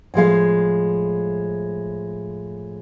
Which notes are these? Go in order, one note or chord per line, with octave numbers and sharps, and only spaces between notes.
A2 F3 G#3 F5